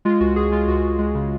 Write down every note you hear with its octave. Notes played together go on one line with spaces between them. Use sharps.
G#3 F4
C#2 F#4
C#2 G#4
G#3 F4
C#2 F#4
C#2
G#3
C#3